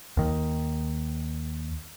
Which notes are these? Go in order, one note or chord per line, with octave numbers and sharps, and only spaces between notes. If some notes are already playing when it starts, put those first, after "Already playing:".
D#2 D#3